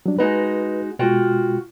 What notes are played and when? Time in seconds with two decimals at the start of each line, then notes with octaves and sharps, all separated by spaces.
0.06 F#3 G3 D4
0.19 G#3 D#4 F#4 B4
0.99 B2 G#3 F4 F#4 G5